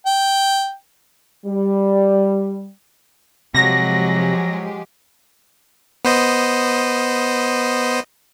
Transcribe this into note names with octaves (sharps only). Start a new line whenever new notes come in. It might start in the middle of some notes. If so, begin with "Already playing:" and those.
G5
G3
C3 F3 F#3 G#3 G4 A#6
B3 C5 D#5